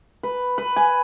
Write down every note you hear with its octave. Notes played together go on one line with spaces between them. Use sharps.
B4
B4
G#5